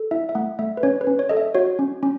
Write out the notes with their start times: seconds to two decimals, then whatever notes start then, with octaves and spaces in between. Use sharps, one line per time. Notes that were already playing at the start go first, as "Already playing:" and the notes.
Already playing: A4
0.11 E4 E5
0.29 E5
0.35 A3 F#5
0.59 A3 E5
0.77 B4
0.83 C#4 C#5
1.01 B4
1.07 C#4
1.19 C#5
1.29 A4 D#5
1.37 E5
1.55 F#4 C#5
1.79 C#4
2.03 C#4